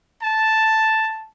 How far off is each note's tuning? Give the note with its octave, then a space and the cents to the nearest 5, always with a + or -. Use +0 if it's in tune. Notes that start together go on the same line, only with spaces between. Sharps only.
A5 +0